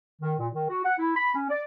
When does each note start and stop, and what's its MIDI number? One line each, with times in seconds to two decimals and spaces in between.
0.22 0.34 51
0.39 0.48 46
0.53 0.67 51
0.70 0.82 66
0.85 0.94 78
0.99 1.14 64
1.16 1.32 83
1.34 1.47 61
1.50 1.62 74